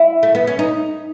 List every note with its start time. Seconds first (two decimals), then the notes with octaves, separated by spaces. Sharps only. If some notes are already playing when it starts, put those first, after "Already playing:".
Already playing: E4
0.23 A3
0.35 B3
0.47 C#4
0.59 D#4